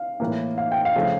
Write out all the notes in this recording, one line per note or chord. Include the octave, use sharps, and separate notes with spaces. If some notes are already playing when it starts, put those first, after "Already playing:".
Already playing: F5
A2 E3 A#3
F5
G5
F5
C#3 F3 A3